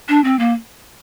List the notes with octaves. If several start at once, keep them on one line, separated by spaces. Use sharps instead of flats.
D4
C4
A#3